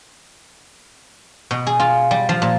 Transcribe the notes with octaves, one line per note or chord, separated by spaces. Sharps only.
B2
G#4
F4
G3
F3
A#2